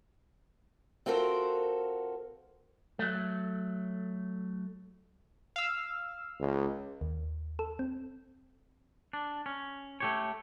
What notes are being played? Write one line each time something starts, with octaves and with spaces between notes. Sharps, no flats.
C4 F4 F#4 A4 A#4 C5
F#3 A3
F5 E6
C#2
D#2
A4
C4
D4
C#4
A3 G4 C#5